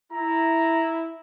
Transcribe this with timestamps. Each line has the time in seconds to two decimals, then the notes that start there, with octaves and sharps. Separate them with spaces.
0.13 E4 A#5